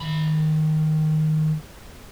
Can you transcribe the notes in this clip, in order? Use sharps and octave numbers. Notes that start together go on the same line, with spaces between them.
D#3 B5